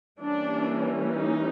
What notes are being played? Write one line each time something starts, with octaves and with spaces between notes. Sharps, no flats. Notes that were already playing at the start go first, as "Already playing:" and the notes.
E3 G3 A#3 C#4 D4
D#4